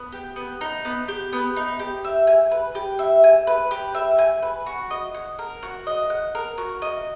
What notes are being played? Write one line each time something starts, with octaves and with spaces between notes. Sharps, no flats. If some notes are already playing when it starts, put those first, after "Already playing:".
Already playing: B3
G4
B3
D#4
B3
G4
B3
D#4
G4
E5
G#5
B4
G4
E5
G#5
B4
G4
E5
G#5
B4
F#4
D#5
F#5
A#4
F#4
D#5
F#5
A#4
F#4
D#5